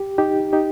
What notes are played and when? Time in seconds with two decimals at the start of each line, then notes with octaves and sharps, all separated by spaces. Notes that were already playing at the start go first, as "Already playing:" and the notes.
Already playing: G4
0.18 D#4 G4
0.53 D#4 G4